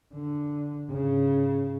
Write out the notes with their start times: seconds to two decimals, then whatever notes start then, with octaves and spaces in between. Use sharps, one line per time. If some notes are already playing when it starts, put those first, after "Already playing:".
0.14 D3
0.90 G#2 C#3